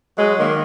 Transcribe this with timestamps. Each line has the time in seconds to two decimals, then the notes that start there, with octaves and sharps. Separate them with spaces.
0.18 F#3 G#3
0.37 D#3 A#3